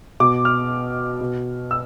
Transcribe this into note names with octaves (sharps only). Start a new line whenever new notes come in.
B2 D6
F6
B2
E6